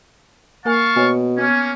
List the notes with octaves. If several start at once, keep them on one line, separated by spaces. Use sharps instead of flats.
A#3 A#4 F5 G#5 A5 C#6
B2 C#5 G#5
A#3 B3 C#4